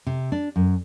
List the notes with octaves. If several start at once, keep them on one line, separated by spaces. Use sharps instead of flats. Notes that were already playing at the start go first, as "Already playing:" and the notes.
C3
D4
F#2